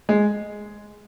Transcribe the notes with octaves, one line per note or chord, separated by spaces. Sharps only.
G#3